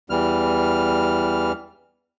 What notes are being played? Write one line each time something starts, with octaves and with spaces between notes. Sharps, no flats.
E2 E3 G3 F6